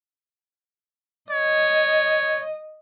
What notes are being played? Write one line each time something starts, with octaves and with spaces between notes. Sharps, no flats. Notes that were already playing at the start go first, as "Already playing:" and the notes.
C#5 D#5